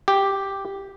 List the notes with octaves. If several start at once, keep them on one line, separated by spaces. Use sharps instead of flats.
G4